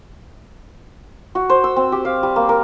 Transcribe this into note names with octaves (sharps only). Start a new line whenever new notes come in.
F#4
C5
E6
C4
G4
F5
G3
A#3
A#4